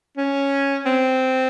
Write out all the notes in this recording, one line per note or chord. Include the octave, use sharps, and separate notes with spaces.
C#4
C4